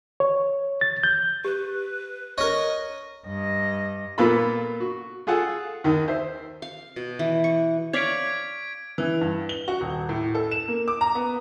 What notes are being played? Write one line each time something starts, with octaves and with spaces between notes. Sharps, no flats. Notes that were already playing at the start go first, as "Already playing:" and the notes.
C#5
A6
G6
G4 B4
A#4 C#5 D#5
G2 D#5
A#2 A#3 B3 F4 A4 B5
F#4
F4 G#4 A4 F#5
D#2 D#3
C5 E5
F5
B2
E3
C#6
C#5 D5 F5 G#6 B6 D7
E3
G2
G7
F#4
D#1
A2
A4
E7
A#3
D6
A#5
B3